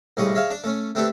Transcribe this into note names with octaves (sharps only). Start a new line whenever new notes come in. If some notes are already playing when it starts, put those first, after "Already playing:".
C2 A2 C#3 G#3 C#6 D#6
G#3 C#5 E5 F5
D4 D5
A3 C#4
A3 C4 D4 G4 A4 B4